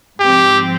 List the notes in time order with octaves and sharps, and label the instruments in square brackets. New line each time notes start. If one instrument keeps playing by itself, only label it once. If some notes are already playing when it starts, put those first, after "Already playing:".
[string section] G#2 F3 C4 [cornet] G4